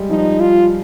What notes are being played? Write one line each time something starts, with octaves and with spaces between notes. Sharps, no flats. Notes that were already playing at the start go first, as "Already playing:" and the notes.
Already playing: G3 G#3
F3 D#4
F4